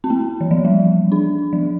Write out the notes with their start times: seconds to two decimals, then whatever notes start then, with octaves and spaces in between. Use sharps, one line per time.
0.04 C4
0.10 A#3
0.41 E3
0.51 F3
0.65 G3
1.12 D4
1.53 F3